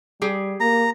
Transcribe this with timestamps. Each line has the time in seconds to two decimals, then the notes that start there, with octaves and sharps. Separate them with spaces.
0.22 G3 G4 G#4
0.60 A#3 A#5